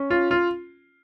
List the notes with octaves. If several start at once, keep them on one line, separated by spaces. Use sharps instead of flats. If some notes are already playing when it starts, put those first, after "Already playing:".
Already playing: C#4
F4
F4